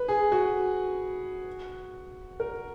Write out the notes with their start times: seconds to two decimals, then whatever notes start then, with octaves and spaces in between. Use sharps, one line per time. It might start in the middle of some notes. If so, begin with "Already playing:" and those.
Already playing: B4
0.08 G#4
0.32 F#4
2.40 A#4